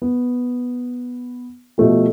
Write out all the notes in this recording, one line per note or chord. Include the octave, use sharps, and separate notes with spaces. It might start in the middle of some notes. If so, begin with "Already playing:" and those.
B3
B2 F3 A3 G4